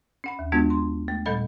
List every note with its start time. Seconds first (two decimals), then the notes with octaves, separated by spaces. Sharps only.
0.24 C#4 F#5 B5
0.39 D#2
0.52 G#3 B3 D4 F4 F#4
0.70 C6
1.08 A3
1.26 A#2 G3 A4 D#5 B5 A6